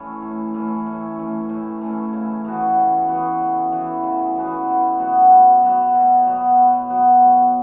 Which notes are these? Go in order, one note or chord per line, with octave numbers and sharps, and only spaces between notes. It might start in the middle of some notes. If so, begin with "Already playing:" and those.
Already playing: E3 A3 C#4
A2
E3 A3 C#4
A2
E3 A3 C#4
A2
E3 A3 C#4
C#3
E3 B3 F#4
C#3
E3 B3 F#4
C#3
E3 B3 F#4
C#3
E3 B3 F#4
B2
F#3 B3 F#4
B2
F#3 B3 F#4
B2
F#3 B3 F#4
B2
F#3 B3 F#4
F#3